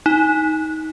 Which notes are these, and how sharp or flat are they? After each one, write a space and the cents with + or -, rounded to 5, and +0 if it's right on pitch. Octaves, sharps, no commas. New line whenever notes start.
D#4 +20